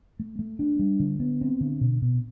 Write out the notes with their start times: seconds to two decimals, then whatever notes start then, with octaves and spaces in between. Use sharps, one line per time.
0.20 A3
0.39 A3
0.59 D4
0.79 G3
1.00 D3
1.20 B3
1.41 C4
1.61 D3
1.81 B2
2.02 B2